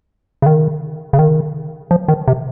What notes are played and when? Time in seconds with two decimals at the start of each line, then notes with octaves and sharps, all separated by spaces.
0.42 C#3
0.46 D#3
1.13 C#3
1.19 D#3
1.91 F3
2.08 D#3
2.28 C3